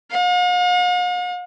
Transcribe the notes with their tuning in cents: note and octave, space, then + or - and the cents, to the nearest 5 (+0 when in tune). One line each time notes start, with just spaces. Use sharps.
F5 +45